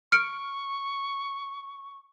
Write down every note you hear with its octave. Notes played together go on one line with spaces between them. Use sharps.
C#6 F6 C#7 D7